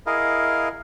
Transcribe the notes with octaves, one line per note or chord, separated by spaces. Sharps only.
E4 G#4 A#4 D#5 F5